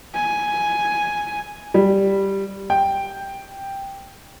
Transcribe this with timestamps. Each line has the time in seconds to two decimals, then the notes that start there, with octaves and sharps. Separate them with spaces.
0.15 G#5
1.74 G3
2.70 G5